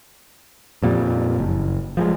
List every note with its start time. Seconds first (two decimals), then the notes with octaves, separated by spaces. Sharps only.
0.82 F2 A#2 G3
1.38 F#1
1.97 F3 G3 G#3